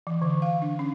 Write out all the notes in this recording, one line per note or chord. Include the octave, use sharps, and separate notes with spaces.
E3
D3
F5
D4
C#4